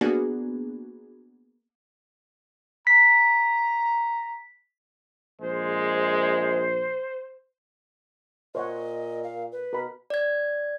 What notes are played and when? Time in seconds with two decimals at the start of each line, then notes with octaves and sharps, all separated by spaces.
0.01 A#3 B3 D4 F#4 G#4
2.87 A#5 B6
5.41 A#1 G#3 C5
8.55 A#2 C5 C#5 D#5 F#5
9.23 F5
9.52 B4
9.73 B2 A#4 B5
10.10 D5 G#6